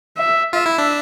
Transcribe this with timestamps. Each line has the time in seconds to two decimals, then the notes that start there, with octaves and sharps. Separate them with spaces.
0.17 E5
0.53 F4 E5
0.66 E4
0.78 D4